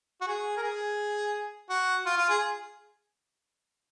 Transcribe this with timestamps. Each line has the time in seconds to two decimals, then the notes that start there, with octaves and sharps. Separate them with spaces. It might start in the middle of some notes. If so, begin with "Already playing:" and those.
0.21 F#4
0.27 G#4
0.57 A#4
0.63 G#4
1.70 F#4
2.06 F4
2.17 F4
2.29 G#4